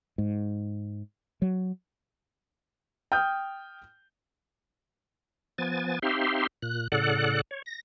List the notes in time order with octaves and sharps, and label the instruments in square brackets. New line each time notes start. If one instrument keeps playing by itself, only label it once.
[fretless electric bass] G#2
F#3
[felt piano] G5 D#6 F6 G6
[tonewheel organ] F3 B3 G#5 A6
C4 D#4 G4 E5 F5 C6
A#2 F#6
A2 C#3 A4 D5 F#5 F#6
C#5
A#6